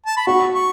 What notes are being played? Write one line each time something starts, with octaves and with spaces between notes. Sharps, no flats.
A5
B5
F#4 C#6
C#6